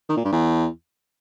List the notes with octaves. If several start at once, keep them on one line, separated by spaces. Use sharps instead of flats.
D#3
A#2
G2
E2